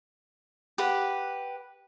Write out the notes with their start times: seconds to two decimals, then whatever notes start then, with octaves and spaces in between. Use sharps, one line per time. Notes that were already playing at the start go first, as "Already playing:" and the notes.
0.78 G4 B4 F#5